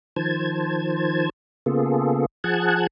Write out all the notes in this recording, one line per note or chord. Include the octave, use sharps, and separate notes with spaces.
D#3 F3 C5 A5 G#6
C#3 A#3 B3 F4 G#4 A4
F3 G#4 F#5 A5 F#6 G#6